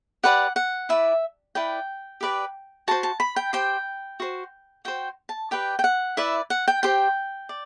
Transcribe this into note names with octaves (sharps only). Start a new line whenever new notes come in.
G4 B4 D5 F#5
F#5
E4 B4 D5 E5
E4 B4 D5 G5
G4 B4 D5
F#4 C5 A5
A5
B5
G5
G4 C5 G5
F#4 C5
F#4 C5 G5
A5
G4 B4 D5 G5
G5
F#5
E4 B4 D5 E5
F#5
G5
G4 C5 G5
D5